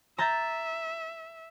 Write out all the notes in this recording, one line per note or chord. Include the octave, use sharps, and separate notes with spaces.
E5 A#5 G6 A6